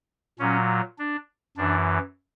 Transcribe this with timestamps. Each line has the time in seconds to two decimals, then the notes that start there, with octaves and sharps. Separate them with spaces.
0.39 A#2 F#3 C#4
0.99 D4
1.57 F#2 E3 D4